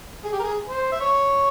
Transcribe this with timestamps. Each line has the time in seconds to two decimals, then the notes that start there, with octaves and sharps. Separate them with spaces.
0.25 G#4
0.32 G4
0.39 A#4
0.43 G#4
0.66 C5
0.92 E5
1.01 C#5